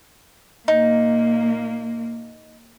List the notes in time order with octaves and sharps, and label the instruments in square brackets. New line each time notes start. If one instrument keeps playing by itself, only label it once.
[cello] A#2 A#3 [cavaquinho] D#4